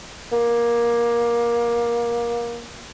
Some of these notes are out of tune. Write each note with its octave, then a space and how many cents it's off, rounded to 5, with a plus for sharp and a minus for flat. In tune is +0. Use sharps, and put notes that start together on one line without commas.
A#3 +20